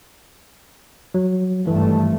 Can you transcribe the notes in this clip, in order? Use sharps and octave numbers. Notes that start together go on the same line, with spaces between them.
F#3
G#1 G2 E3 A3